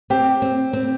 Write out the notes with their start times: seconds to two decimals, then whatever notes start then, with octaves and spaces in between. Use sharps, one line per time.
0.10 C4 G4
0.42 C4
0.73 C4